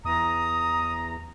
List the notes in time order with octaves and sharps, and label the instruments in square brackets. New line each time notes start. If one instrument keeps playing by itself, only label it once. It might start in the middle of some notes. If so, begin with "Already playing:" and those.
[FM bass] E2 [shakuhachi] A#5 [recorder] D#6